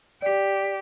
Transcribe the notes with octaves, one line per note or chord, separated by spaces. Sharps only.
G4 D5